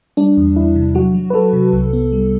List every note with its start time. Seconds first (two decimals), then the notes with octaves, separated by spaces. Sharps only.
0.17 G3 D4
0.37 E2
0.56 E2 E4
0.76 C3
0.95 F#3 F#4
1.14 F#3
1.30 B4
1.34 F#3 A4
1.53 C3
1.73 C2
1.93 B3
2.12 G3